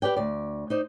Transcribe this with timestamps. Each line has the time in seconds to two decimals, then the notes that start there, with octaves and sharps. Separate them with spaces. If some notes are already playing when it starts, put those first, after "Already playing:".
0.02 G4 B4 D5 G5
0.16 D2 D5
0.70 D#4 C5 D5